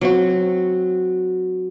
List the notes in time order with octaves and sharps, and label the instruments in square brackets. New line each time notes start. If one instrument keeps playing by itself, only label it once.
[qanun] F#3 C4 F#4